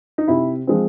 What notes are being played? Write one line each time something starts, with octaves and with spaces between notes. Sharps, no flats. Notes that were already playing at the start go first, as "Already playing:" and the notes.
D#4
C3 E4
F3 G#3 C4